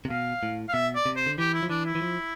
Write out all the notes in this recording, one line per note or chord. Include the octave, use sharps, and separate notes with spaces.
C3
B2 F5
A2
F5
B2 E5
D5
C3
C5
D3
E3 G4
E4
F3
E3 D4
E4
E3
F3